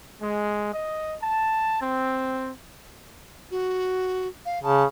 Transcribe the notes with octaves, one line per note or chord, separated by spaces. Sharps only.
G#3
D#5
A5
C4
F#4
F5
C#3 A5